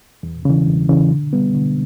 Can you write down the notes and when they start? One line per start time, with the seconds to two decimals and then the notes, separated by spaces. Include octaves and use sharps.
0.23 E2
0.45 C#3 E3
0.68 E2
0.89 C#3 E3
1.11 D3
1.33 G3 B3
1.55 D3